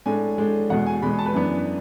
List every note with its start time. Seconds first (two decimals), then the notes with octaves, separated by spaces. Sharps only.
0.06 A2 G#3 D4 G#5
0.38 A2 G#3 D4
0.69 E2 B2 G#3 F#5
0.87 G#5
1.02 E2 B2 G#3 B5
1.19 A5
1.26 B4
1.34 F#2 E3 B3 D4